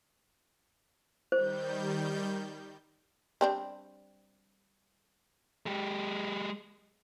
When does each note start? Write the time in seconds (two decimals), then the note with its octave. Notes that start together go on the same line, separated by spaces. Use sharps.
1.32 D#3 G3 C5 G6
3.41 G3 C4 D4
5.66 G#3 G4